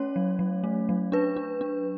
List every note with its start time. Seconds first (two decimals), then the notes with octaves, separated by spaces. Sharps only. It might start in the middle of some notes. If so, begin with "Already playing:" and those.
Already playing: A3 C#4 C#5
0.16 F#3
0.39 F#3
0.64 A3
0.89 F#3
1.12 D4 B4
1.36 D4
1.61 D4